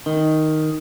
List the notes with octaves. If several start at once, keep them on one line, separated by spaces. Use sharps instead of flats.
D#3